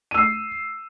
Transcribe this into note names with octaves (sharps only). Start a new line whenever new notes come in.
E6 C7 D#7